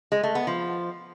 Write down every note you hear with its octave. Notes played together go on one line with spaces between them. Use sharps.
G#3
A3
B3
F3